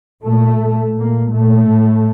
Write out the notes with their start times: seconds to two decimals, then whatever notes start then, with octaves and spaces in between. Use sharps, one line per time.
0.24 A#2 A3
0.61 A#2
0.96 A#2 A#3
1.32 A#2 A3
1.68 A2